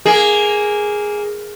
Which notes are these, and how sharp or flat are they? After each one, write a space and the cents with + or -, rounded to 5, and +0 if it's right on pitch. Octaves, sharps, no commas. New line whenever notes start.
A#3 +0 G#4 +0